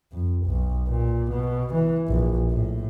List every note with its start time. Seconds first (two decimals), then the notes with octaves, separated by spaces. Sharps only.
0.12 F2
0.46 B1
0.89 A#2
1.31 B2
1.74 E3
2.08 A#1
2.51 A2